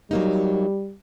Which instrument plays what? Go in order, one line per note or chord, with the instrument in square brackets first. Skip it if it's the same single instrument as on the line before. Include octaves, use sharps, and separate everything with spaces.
[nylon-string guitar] F#3 A#3 D#4 [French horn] G3